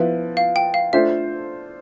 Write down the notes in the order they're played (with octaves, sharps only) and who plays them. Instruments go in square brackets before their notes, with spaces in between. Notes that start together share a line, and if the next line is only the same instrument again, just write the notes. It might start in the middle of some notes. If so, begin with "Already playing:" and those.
Already playing: [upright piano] F3 B3 E4 B4 [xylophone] E5
[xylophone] F5
G5
F5
[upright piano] A3 D4 F4 C5 [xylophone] E5